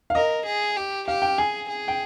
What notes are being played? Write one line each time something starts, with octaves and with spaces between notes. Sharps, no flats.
F5
A#4 D#5
G#4
G4
G4 F5
G5
G#4 G#5
G#4
G5